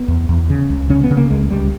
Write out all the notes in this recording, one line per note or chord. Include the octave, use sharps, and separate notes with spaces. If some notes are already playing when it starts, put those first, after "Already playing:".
Already playing: B3
E2
E2
C#3
C#2
C#3 C#4
B3
C#3
A#3
C#2 G#3
C#2 G3